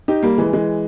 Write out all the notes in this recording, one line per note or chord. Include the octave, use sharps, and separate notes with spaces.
D#4 G4
G3 A#3
E3 G#3
E3 G#3